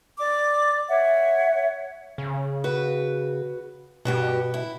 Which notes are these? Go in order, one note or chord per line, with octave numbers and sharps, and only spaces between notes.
D5 D6
C#5 E5 F#5
C#3
F#4 B4
G2 B2 F#4 G4
E4